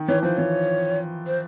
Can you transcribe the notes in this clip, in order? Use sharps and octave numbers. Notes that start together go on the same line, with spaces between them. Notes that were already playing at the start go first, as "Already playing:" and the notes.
Already playing: D#3
E3 C#5
F3 C5
E3 C#5
C5